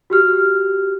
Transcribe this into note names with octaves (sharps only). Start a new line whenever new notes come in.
F#4 G4 F6